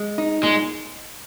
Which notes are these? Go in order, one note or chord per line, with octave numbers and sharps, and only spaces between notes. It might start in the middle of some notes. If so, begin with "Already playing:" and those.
Already playing: G#3
D#4
A#2 G#3